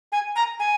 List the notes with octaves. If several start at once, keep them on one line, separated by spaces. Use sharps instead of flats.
G#5
A#5
G#5